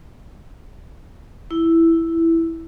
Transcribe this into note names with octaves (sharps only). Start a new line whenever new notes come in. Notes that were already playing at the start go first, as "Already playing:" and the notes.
E4